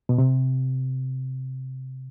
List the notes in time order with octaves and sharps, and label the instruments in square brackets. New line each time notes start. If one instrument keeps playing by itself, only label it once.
[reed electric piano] B2
C3